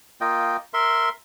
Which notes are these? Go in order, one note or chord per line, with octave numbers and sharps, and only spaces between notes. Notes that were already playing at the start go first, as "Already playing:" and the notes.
A#3 F4 D#5 G5
A#4 E5 C6